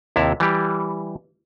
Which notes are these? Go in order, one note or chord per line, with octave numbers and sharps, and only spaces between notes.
D#2 C3 E4 A5 A#5
E3 G3 G4